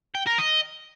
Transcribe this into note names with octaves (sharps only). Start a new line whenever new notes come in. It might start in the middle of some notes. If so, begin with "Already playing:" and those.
G5
A#4
D#5